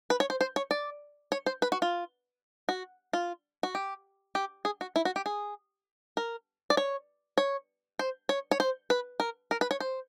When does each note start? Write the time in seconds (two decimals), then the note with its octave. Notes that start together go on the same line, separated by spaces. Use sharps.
0.10 B4
0.20 C#5
0.30 C5
0.41 C5
0.56 C#5
0.71 D5
1.32 C#5
1.46 C5
1.62 B4
1.72 F#4
1.82 F4
2.69 F#4
3.13 F4
3.63 F#4
3.75 G4
4.35 G4
4.65 G#4
4.81 F#4
4.96 E4
5.05 F#4
5.16 G4
5.26 G#4
6.17 A#4
6.70 D5
6.77 C#5
7.38 C#5
7.99 C5
8.29 C#5
8.51 C#5
8.60 C5
8.90 B4
9.20 A#4
9.51 A#4
9.61 B4
9.71 C#5
9.80 C5